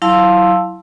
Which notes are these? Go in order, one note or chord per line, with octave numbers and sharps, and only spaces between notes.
F#3 E4 F5 A5 C6 E6